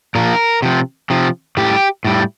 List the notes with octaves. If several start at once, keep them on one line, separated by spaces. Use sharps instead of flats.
A#2 F3 A#4
C3 F3
C3 F3
A2 G3 G4
A2 G3